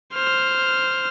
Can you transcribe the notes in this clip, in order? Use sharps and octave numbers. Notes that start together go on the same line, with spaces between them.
C5 F6